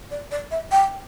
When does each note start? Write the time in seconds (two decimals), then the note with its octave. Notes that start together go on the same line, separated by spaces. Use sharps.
0.11 D5
0.31 D5
0.51 E5
0.72 G5